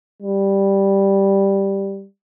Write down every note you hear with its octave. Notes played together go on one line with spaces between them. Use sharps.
G3